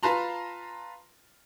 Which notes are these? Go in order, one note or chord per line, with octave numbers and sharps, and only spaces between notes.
F4 B4 A5 A#5 C6